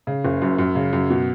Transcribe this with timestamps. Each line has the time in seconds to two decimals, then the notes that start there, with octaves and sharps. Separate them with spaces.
0.07 C#3
0.25 F#1
0.42 F#2
0.59 F#2
0.75 C#3
0.93 F#2
1.10 B2